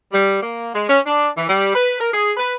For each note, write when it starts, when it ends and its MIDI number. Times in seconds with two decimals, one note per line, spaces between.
0.12 0.40 55
0.41 0.67 58
0.73 0.83 56
0.88 0.99 61
1.06 1.28 62
1.35 1.44 52
1.48 1.71 55
1.74 1.95 71
1.99 2.09 70
2.12 2.31 68
2.37 2.55 71